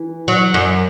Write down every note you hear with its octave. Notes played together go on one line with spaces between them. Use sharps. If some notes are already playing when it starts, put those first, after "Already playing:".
Already playing: E3
F#3
F#2